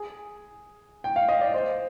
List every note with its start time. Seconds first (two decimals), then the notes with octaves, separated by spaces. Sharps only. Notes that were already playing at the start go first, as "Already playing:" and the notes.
Already playing: G#4
1.04 G5
1.16 F5
1.29 D#5
1.41 D5
1.54 C5